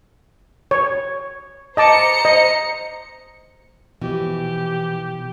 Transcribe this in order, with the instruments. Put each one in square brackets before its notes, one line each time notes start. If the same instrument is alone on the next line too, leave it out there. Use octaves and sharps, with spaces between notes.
[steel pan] C#5
[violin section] C5 A#5 C#7 [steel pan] D#5 A5 D6
[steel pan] D#5
[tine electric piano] B2 F3 [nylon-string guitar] E3 [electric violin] G4